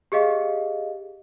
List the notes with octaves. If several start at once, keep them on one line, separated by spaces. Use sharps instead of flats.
G4 G#4 D#5 F5